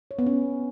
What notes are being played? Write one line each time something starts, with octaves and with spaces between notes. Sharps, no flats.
C#5
B3
C#4